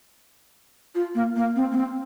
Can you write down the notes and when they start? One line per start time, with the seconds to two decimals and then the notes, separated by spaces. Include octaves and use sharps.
0.95 F4
1.15 A#3
1.36 A#3
1.55 C4
1.71 A#3
1.76 C4